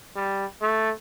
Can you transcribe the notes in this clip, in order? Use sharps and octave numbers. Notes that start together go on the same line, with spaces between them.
G3
A3